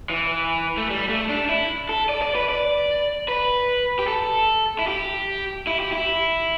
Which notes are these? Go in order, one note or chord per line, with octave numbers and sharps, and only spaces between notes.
E3
A3
G3
A3
D4
E4
A4
D5
D5
B4
D5
B4
G4
A4
E4
G4
E4
G4
E4